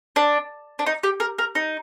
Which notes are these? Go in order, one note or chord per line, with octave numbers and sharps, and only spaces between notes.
D4
D4
D#4
G4
A#4
A#4
D#4